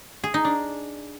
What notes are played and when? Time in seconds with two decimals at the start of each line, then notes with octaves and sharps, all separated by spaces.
0.24 G#4
0.34 D#4
0.45 D4